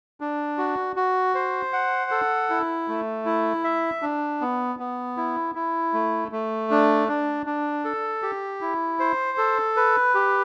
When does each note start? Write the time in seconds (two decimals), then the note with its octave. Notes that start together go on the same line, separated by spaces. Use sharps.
0.21 D4
0.58 F#4
0.96 F#4
1.35 C5
1.73 F#5
2.11 A4
2.50 E4
2.88 A3
3.25 E4
3.64 E5
4.02 D4
4.41 B3
4.79 B3
5.17 E4
5.55 E4
5.93 A3
6.32 A3
6.71 D4
7.08 D4
7.46 D4
7.85 A4
8.22 G4
8.61 E4
8.99 C5
9.38 A4
9.77 B4
10.15 G4